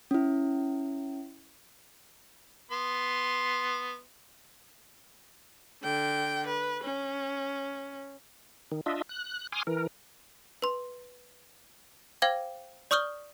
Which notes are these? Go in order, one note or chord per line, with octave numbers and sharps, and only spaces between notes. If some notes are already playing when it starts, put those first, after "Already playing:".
C#4 E4
B3 C6
D3 G5
B4
C#4
D#3
D4 F4 D#5 E5
F#6
G#5 C6 D6 D#6 F6
E3 A#4
B4 C6
C5 F5 G5 D6 G#6
D5 C#6 D#6 F6 G6 G7